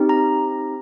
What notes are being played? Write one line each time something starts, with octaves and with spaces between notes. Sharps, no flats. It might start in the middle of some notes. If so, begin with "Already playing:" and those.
Already playing: C4 D#4 G4
A#5